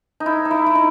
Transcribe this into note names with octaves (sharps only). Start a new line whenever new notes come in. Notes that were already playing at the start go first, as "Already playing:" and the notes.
D#4
E4
D#4
E4
E4
D#4